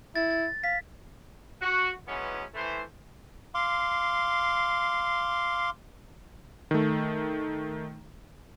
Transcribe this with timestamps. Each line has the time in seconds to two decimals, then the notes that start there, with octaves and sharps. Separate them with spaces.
0.16 E4 A6
0.31 A6
0.64 F5 B6
1.62 F#4
2.08 E3 F#3 G#3 B3 C#4 E4
2.55 E3 A3 C5
3.55 F5 C6 D6
6.71 D#3 A3